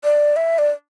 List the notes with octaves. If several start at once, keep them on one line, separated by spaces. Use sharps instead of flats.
D5
E5
D5